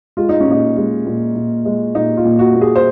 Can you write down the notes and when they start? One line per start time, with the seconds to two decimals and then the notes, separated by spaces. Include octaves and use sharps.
0.17 G#3 F4
0.29 D#4
0.41 C#4
0.47 A#2 D#4
0.77 G#3
1.06 A#2
1.35 A#2
1.65 G#3
1.95 A#2 D#4
2.17 F4
2.25 A#2
2.39 F#4
2.54 A#2
2.61 G#4
2.76 C5